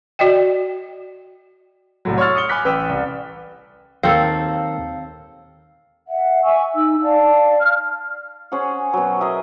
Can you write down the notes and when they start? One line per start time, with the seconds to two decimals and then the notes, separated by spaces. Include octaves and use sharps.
0.19 F#4 D5 D#5 G5
2.05 C2 A2 F#3
2.18 C#5 C6 C#6 E6 F6 A6
2.35 D#6 C#7 G7
2.49 G#5 B5 D6 F#6 B6
2.64 A1 B4 G5 E6
2.89 C2
4.03 D#2 A#3 C4 A4 F5
6.08 E5 F#5
6.44 E5 G#5 C#6 E6
6.74 D#4 E6
7.01 D5 F5 A5
7.60 F5 F6
8.52 C#4 G#4 C5 F#5
8.93 B2 F#3
9.20 G#4 A#4 D#5 E5